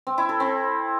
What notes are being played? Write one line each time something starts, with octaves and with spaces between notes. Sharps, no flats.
C4
E4
A4
C4